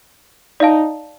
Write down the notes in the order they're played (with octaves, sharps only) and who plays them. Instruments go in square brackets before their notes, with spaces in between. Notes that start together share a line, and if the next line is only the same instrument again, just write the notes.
[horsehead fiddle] D#4 [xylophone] D5 F5 A5